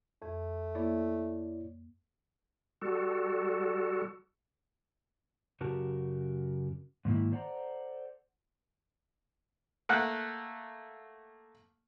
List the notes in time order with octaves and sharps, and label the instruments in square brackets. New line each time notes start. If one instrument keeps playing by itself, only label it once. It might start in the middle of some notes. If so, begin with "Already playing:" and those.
[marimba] F2 [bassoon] A3
[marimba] A#3 [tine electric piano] E4 C#5 D5
[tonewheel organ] G3 F#4 A4
[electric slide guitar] F#2 C#3 F#4 G4 A#4 A5
G#2 D#3 A#3 E4
A4 C5 D5 F#5 G5 A#5
[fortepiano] A3 A#3 F#5 F#6